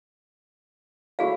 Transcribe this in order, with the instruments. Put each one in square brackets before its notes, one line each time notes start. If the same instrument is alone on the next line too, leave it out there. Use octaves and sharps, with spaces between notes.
[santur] A3 E4 C#5 [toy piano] F#4 G#4 F5